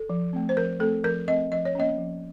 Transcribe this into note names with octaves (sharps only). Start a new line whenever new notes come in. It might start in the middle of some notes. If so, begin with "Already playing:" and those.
Already playing: A4
F3
A3 C4
C5
F3 A#4
A3 C4 A4
F3 A#4
A3 C4 D#5
F3 D#5
C#5
A#3 C#4 D#5
F3